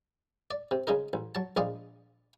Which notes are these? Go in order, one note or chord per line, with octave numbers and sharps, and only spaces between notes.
D5
C3
C#3 G#3 D#4 A#4
A1
F#3 A5
A#1 G#3 D5 D#5 F5